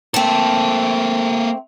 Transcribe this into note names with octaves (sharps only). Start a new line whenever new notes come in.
A3 A#3 C4 A4